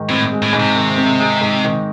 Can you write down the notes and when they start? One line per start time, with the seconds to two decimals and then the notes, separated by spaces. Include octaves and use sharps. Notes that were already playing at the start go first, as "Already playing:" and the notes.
Already playing: G#2 D#3 G#3
0.09 A2 C4
0.32 G#3
0.42 A2
0.53 G#2
0.60 C3
0.76 D#3
0.98 C4
1.19 G#3
1.41 G#2
1.64 D#3